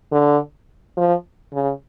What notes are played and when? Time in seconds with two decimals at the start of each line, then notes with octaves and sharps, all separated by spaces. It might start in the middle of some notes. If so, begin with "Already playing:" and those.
0.12 D3
0.97 F3
1.53 C#3